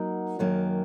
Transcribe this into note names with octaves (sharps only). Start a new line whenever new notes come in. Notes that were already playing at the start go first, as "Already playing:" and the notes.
Already playing: F#3 A#3 D#4 F#4 A#4
F#2 D#3 F#3 A#3